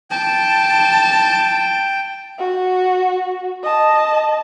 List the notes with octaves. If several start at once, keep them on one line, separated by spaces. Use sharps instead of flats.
G5 A5
F#4
D#5 A5